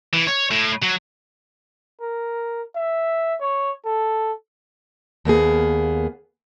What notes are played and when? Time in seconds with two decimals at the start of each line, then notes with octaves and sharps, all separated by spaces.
0.14 E3
0.27 C#5
0.51 A2
0.82 F#3
2.01 A#4
2.76 E5
3.41 C#5
3.85 A4
5.25 D#2 A#3 B3 G#4